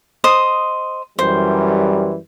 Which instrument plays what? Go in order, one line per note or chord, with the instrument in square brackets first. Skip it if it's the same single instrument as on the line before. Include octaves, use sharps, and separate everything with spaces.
[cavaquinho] C5 D#5 D#6
[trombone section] F#2 E3 G3 [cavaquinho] C5